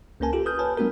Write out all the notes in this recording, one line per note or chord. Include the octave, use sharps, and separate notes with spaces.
C#2 A#3 C#4 A#4 G#5 A5
F4 G4 A4
B4 D#6 F6 G6
B4 C#5 G#5 A5
G3 A3 B3 D4 F#4 A#4